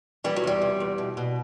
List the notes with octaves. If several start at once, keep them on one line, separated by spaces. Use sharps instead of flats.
E3 G3
F#3
E2 G3
C3
E2
B2
B2